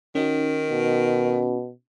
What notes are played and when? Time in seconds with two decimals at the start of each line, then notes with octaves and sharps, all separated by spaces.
0.15 D#3 C#4 D#4 F#4
0.71 B2